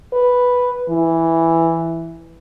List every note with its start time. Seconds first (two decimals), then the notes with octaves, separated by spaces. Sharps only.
0.13 B4
0.90 E3